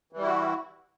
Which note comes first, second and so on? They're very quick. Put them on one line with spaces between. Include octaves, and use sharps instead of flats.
E3 G3 E4 F#4